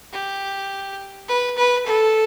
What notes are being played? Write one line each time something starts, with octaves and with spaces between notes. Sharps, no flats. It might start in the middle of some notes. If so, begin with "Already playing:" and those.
G4
B4
B4
A4